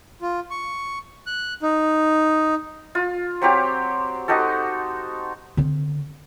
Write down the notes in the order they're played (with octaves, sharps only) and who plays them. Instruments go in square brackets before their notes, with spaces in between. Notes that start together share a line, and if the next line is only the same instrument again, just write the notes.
[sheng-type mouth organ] F4
C#6
F#6
D#4
[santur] F4
F#3 C4 G4 D6
D#4 F#4 G4 A4
[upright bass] D3 C4